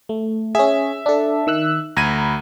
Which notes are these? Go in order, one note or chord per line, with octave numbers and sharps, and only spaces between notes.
A3
C#4 G#4 E5
D4 A4
D#3 E6 F#6
D2 A#5 B5 G#6 D#7